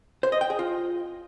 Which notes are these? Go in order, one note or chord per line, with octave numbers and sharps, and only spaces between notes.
C5
D#5
G5
G#4
F4